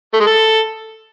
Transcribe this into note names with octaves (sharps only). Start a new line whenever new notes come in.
A3
G#3
A4